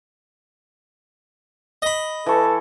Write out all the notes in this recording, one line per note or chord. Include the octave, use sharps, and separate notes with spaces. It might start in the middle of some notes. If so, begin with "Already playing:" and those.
D#5 B5
E3 A4 C#6